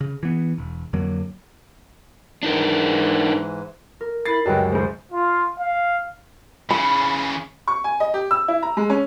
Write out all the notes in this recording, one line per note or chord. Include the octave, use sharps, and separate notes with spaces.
C#3
E3 B3
E1
F2 D3 F#3 A#3
G#2 E3 D4 D#4 A#4
A#4
E4 B5 A6 C7
C#2 F#2 F#3 G3 B4 D#5 G5
F#1 G#3 C5
F4
F5
C#3 E3 B5
C#6
G#5
D#5
G4
E6
E4
A#5
G#3
C#4